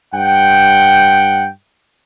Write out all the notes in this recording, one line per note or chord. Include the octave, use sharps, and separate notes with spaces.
G2 F#5 G5